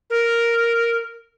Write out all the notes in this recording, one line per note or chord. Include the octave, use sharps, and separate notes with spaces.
A#4